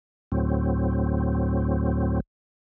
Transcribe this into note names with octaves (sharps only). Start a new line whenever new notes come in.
D2 A2 F#3 C4